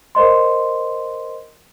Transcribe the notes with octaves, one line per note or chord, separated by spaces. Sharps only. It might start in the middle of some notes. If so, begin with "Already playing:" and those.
A#4 C5 D#5 C6